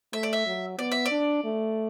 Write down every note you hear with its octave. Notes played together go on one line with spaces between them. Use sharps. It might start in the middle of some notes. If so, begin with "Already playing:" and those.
A3 E5
D5
E5
F#3
B3 D5
E5
D5
D4
A3